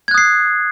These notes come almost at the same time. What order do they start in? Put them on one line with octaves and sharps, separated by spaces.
G#6 F#6 D#6 C7